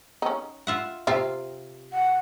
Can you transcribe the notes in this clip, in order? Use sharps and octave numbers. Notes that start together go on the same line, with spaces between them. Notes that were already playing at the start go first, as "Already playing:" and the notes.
C#4 D#4
F4 E5 F#5
C3 F4 G4 E5
F#5